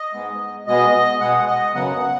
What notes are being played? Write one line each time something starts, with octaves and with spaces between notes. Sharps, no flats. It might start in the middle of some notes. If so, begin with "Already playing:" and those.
Already playing: D#5
G#2 G#3 B3
B2 G#3 B3 D#5
B2 G#3 B3 F#5
D#5
F#2 C#3 F#3 B3 F#5